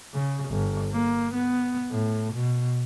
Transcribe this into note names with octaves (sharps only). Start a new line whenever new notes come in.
C#3
G1
A#3
B3
A2
B2